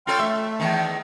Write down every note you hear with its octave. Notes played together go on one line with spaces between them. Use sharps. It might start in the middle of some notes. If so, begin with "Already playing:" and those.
F4 A4 C#5 G5 C6 F6
A3 E5
E2 D#3